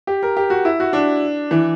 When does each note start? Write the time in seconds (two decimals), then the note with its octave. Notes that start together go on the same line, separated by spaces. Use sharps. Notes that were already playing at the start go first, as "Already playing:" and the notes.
0.07 G4
0.23 A#4
0.37 G4
0.50 F#4
0.65 E4
0.80 F#4
0.93 D4
1.51 E3